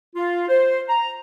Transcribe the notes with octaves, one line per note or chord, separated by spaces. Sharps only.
F4
C5
A#5